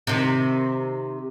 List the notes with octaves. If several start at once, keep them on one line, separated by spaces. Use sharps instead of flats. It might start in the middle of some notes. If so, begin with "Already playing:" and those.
C3 D#3